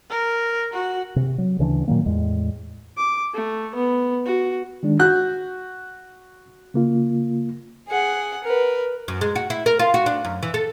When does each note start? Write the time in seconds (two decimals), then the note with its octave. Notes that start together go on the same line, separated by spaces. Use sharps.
0.10 A#4
0.73 F#4
1.16 C3
1.38 F#3
1.59 D2 C#3 E3 D4
1.88 A#2 D#3 F#3 A#3
2.06 E2 A2 G#3
2.97 D6
3.34 A3
3.75 B3
4.26 F#4
4.83 D#3 G#3 D4
4.99 F#4 F#6 G6
6.74 C#3 A#3 F4
7.88 G#4 F#5
8.44 A#4 B4
9.08 F#2
9.21 G#3
9.36 F#4
9.50 E4
9.66 A#4
9.79 F4
9.94 F#4
10.06 D4
10.25 F#2
10.43 E3
10.54 A4